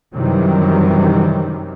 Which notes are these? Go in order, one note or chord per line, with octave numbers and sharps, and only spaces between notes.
F#2 C3 D#3 E3 F#3 G3